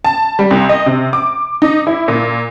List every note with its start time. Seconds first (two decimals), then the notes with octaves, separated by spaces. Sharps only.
0.05 A5
0.39 G3
0.51 C2
0.69 D#5
0.86 C3
1.13 D6
1.62 D#4
1.87 E4
2.08 A#2